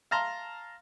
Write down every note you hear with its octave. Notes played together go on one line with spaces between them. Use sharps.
F5 A5 A#5 C6